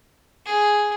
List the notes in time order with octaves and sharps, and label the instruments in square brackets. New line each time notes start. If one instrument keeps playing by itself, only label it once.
[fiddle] G#4